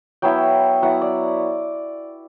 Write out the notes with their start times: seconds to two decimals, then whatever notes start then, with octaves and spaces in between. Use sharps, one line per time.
0.22 F#3 B3 E4 G5
0.82 F#3 B3 E4 F#5
1.02 D5